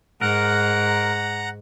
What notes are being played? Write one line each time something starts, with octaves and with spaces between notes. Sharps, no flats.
G#2 A#4 F#5 A#5 F#6